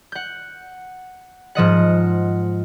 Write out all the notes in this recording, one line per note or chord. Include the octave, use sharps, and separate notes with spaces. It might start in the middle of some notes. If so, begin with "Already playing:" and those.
F#5 G6
G#2 F3 D#5 F#5